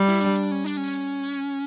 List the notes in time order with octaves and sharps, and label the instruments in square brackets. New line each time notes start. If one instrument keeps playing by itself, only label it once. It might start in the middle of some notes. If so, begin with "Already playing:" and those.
Already playing: [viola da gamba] G3
[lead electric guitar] E4
D4
C#4
D4
C#4